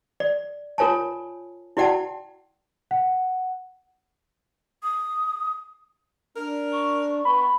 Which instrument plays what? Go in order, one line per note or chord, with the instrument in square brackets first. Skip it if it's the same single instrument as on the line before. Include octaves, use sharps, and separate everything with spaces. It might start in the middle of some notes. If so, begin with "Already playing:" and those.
[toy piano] D5
F4 A#4 C#5 G#5 A5
E4 F#4 D5 F#5 G5 A5
[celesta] F#5
[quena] D#6
[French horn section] D4 [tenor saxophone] A#4
[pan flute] C#6
[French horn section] B3 [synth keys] B5